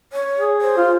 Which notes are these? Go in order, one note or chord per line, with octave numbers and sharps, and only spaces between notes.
C#5
G#4
C5
F4